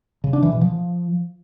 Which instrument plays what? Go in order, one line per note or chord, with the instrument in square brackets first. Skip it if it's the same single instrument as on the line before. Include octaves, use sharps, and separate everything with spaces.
[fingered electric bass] C#3
D4
E3
B2
F3